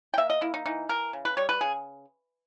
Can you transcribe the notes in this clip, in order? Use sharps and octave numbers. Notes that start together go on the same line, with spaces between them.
G5
A#3 E5
D#5
A#3 E4
D#4
E3 D#4
E3 A#4
C#3
B4
G3 C#5
B4
C#3 G#4